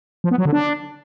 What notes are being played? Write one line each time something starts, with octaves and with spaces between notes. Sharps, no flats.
F3
B3
F#3
D3
D4